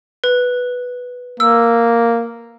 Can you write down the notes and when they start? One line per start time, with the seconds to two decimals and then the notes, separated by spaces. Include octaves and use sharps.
0.24 B4
1.40 A#3 E6